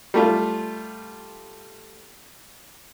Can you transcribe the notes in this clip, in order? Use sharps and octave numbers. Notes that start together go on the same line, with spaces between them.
G3 A3 F4